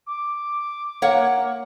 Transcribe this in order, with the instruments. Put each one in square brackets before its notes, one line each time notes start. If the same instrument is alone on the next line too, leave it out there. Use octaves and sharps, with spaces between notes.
[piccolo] D6
[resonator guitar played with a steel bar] A#3 C#5 F#5